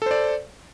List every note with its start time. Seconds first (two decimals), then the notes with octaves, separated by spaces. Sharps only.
0.02 A4
0.06 C5
0.11 D5